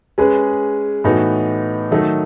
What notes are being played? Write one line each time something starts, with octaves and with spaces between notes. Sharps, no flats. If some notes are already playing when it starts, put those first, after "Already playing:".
G#3 C#4 G#4 B4
A2 E3 B3 D#4 F#4
D#3 F#3 A3 D#4 A4